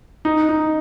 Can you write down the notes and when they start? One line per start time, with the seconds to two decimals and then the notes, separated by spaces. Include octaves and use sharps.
0.25 D#4
0.49 D#4